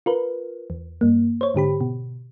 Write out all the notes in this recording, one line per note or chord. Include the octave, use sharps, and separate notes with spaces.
F4 A#4 B4
E2
G2 A#3
C5 C#5
G#2 D3 G4 B5
B2